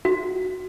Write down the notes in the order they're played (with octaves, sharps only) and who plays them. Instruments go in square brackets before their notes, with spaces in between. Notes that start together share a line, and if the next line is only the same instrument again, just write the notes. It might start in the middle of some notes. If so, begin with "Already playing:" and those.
[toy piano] F#4